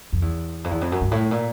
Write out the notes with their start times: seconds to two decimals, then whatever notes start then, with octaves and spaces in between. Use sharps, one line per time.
0.13 F2
0.22 E2
0.64 F2
0.71 E2
0.81 F2
0.92 F#2
1.01 G2
1.11 A2
1.31 A#2